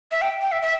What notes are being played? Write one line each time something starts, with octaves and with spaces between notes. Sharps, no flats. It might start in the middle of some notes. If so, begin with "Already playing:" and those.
E5
G5
G5
E5
E5